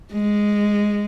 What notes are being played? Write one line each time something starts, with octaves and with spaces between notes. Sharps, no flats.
G#3